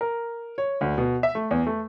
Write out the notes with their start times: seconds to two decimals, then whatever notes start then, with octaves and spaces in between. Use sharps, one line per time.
0.01 A#4
0.58 C#5
0.81 D2
0.98 B2
1.23 E5
1.35 A3
1.51 E2
1.67 A3